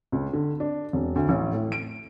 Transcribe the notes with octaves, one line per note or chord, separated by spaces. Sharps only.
C#2
D3
D4
E1
D2
A1
A2
D7